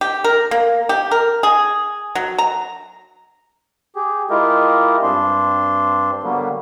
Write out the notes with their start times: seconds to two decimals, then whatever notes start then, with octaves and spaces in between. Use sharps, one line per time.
0.01 G4
0.24 A#4
0.51 A#3
0.89 G4
1.11 A#4
1.43 G#4
2.15 F#3
2.38 A#5
3.96 G4 G#4
4.30 G#3 E4 F4 G4 A#4 D#5
5.03 G2 C4 D4 C6
6.23 D3 F#3 G3 A#3 B3